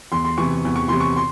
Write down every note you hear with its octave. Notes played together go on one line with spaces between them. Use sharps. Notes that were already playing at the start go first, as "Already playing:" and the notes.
E2 C6
C6
C3 E3 C#6
E2
C#6
C3 E3 C6
C#6
C6